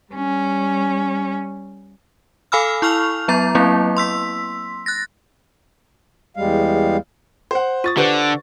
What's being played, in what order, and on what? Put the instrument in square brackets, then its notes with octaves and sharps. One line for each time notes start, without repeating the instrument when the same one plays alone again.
[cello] G3 C#4
[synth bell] A4 F5 G#5 B5 E6 F6
E4 C#6 F6 F7
F#3 B3 A#5 A6
F#3 A#3 C4 E4
C6 E6 B6
F#6 A6 A#6
[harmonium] E2 G3 G#3 F5
[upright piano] C5 F#5 [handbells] C6
[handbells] F4 D#6 [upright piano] C#6 A6
[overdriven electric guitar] D3 [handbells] G4 B4 C5